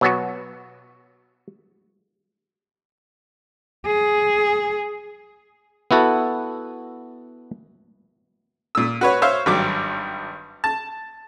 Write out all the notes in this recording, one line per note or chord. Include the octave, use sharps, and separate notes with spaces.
B2 F#3 B3 F#4
G#4
B3 E4 F#4 A4
A#2 E6
F#4 B4 C#5
C5 C#5 E5 F5
G#1 G2 F#3 D6
A5